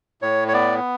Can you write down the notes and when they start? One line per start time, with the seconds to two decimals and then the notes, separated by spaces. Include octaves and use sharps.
0.22 A2 C#5
0.48 C#5
0.53 B3 D5